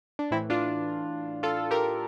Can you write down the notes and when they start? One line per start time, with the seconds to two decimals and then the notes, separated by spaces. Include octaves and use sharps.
0.19 D4
0.31 A2 E3 C4 E4
0.50 D4 F4
1.43 F4 A4
1.71 G4 A#4